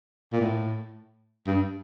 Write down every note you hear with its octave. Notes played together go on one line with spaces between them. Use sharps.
A#2
A2
G2